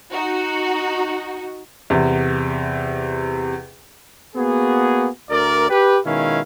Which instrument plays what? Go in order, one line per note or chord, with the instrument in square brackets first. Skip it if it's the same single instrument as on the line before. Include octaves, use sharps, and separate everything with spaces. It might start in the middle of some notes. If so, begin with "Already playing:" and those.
[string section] D#4 F#4
[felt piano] E2 C3
[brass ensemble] A#3 B3 F#4 G#4
D2 A#4 D5
G4 B4
B2 D#3 G#3 C#4 E4 F5